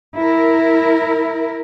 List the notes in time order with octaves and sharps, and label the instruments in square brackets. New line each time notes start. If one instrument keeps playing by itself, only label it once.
[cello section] E4 A#4